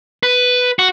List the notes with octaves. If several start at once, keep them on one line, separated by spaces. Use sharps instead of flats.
B4
F#4